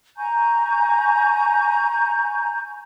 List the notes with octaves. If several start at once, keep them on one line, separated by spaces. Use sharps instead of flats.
G#5 A#5 C#6 G6